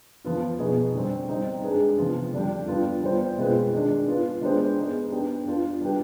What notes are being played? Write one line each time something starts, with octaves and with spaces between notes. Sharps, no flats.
F3 B3 F4
B2 B3 D#4 G#4
D3 G3 C4
G3 C4 D#4
G#3 D4 G#4 B4
C3 F3 B3 F4
D3 G3 D4 G4
G3 B3 D4 F4
G3 B3 F4 C5
B2 G#3 C4 F4 B4
D#3 G#3 D4
B3 F4 B4
G#3 B3 D4 G4 C5
B3 D#4 G#4
B3 D4 G4
B3 D4 F4 B4
G3 D4 G4 B4